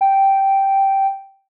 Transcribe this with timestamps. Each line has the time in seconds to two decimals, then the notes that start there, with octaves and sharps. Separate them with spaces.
0.01 G5